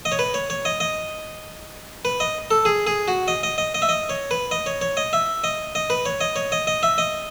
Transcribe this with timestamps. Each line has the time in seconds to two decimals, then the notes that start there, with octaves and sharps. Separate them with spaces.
0.05 D#5
0.12 C#5
0.19 B4
0.34 C#5
0.50 C#5
0.65 D#5
0.80 D#5
2.05 B4
2.20 D#5
2.51 A4
2.65 G#4
2.87 G#4
3.08 F#4
3.28 D#5
3.43 D#5
3.58 D#5
3.75 D#5
3.82 E5
3.89 D#5
4.10 C#5
4.31 B4
4.51 D#5
4.66 C#5
4.82 C#5
4.97 D#5
5.13 E5
5.44 D#5
5.75 D#5
5.90 B4
6.06 C#5
6.21 D#5
6.36 C#5
6.52 D#5
6.67 D#5
6.83 E5
6.98 D#5